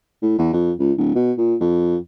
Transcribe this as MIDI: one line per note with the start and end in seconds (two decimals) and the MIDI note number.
0.22 0.37 45
0.39 0.52 40
0.53 0.72 41
0.79 0.92 37
0.98 1.11 26
1.15 1.32 47
1.38 1.55 46
1.60 1.97 41